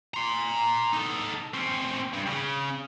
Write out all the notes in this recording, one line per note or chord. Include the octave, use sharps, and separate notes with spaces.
A#5 C6
D#4 A4
C4 C#4
G2
C#3